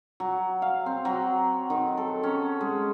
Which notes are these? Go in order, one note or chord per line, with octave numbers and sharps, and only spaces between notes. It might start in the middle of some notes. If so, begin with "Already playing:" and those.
F#3
F5
C4
F#3
D#3
A4
C#4
G#3